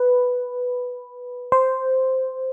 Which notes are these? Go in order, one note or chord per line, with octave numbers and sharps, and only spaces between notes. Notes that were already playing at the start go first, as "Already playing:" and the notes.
Already playing: B4
C5